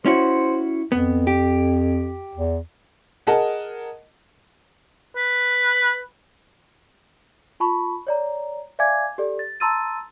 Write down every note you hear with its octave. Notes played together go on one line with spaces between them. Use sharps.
C#4 E4 F#4 C5
F2 B3
G4
E2
G#4 A#4 D#5 F#5 A5
B4
F4 A5 B5 C#6
C#5 D5 A#5
D5 E5 F5 G#5 D6 G#6
G4 A4 D5
A6
A5 A#5 C6 E6 A6 D#7